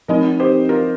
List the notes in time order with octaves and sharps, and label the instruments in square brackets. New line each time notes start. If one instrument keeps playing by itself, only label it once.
[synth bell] F3 C4 D#4 [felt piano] A#4 D#5
[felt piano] G4 C5
F4 A#4